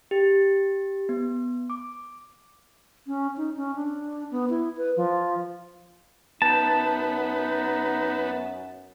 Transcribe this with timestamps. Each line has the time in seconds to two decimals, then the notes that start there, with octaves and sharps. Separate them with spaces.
0.11 G4
1.09 B3
1.70 D6
3.07 C#4
3.37 D#4
3.57 C#4
3.75 D4
4.31 B3
4.50 E4
4.77 B4
4.97 F3
6.42 F#2 B3 D#4 A5